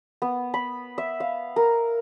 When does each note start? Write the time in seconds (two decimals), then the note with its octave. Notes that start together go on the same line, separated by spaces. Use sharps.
0.22 B3
0.54 B5
0.98 E5
1.20 F5
1.56 A#4